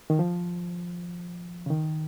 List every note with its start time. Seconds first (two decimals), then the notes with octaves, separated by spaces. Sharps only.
0.10 D#3
0.19 F3
1.66 C#3
1.70 D#3